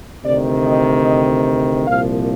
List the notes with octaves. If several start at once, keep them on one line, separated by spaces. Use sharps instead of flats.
D2 C3 D#3 D5
D#5
D#5
C2 A#2 F3 F5